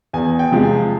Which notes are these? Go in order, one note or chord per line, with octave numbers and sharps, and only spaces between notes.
E2 G#5
G5
C3 F3 G#3
G#5